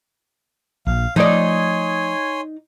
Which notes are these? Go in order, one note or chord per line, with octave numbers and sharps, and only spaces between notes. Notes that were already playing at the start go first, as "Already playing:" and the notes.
A#1 F5
F3 A3 D#4 C#5 D5 G#5 C6